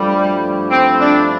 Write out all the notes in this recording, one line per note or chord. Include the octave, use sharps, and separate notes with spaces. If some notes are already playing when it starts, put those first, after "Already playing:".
Already playing: G2 F3 G3 A3 E4 G4
C4
D4